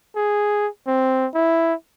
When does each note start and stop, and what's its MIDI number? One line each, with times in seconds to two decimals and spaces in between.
0.16 0.67 68
0.87 1.27 60
1.34 1.74 64